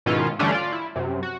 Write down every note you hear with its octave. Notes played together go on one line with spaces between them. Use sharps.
G#2 B2 D#3 C#4 E4 F4
D3 E3 G3 A3 C#4 D4
F4 D5
E4
F#2 C3
F#4